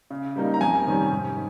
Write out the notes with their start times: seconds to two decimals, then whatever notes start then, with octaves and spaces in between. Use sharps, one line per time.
0.10 C#3
0.36 G3 A#3 D#4
0.54 A#5
0.61 F2 G#5
0.86 C3 D#3 G3 C#4
1.12 G#2